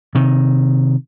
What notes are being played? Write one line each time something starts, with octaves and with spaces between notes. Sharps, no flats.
C3 D#3